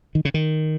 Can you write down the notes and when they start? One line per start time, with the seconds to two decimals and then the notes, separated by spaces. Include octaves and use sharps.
0.15 D#3
0.25 C#3
0.34 D#3